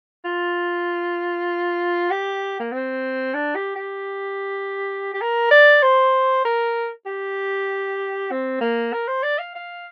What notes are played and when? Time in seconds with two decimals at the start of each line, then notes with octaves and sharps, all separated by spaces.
0.25 F4
2.10 G4
2.60 A#3
2.72 C4
3.34 D4
3.55 G4
3.76 G4
5.14 G4
5.21 A#4
5.51 D5
5.82 C5
6.45 A#4
7.06 G4
8.31 C4
8.61 A#3
8.93 A#4
9.08 C5
9.23 D5
9.39 F5
9.55 F5